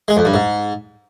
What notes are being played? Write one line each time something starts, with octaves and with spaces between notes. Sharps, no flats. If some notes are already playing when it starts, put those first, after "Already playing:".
G#3
F2
G2
G#2